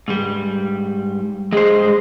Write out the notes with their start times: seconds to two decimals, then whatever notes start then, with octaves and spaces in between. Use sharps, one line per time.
0.08 G#2 G3
1.53 G2 G#3 C5